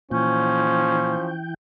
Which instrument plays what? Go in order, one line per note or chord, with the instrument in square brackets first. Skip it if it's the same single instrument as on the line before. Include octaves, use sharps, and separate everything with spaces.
[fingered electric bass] A#2 [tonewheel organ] E3 G5 [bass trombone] F3 [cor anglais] C#4